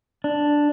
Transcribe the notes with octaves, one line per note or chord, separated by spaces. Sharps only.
D4